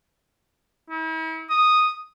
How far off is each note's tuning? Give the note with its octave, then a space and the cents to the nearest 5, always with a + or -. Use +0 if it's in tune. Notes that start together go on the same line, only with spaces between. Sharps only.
E4 -40
D#6 -5